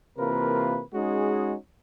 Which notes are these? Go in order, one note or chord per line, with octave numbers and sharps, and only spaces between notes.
C3 E3 A#3 F4 A#4 B4
G#3 C#4 D#4 F#4 G#4